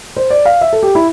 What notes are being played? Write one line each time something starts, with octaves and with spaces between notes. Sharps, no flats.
C5
D5
F5
E5
A4
G4
E4